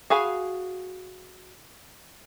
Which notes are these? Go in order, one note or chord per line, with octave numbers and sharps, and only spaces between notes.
F#4 G#4 F5 G#5 B5